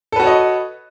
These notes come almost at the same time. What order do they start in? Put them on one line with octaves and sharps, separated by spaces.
A4 B4 F#4 C#5 D#5